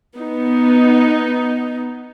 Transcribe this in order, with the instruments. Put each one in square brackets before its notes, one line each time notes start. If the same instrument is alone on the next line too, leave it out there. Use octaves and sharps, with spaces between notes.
[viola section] B3 D#4